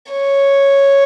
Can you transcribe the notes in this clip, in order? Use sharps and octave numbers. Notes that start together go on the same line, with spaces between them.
C#5